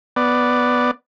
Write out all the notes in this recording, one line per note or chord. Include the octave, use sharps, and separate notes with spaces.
B3 D5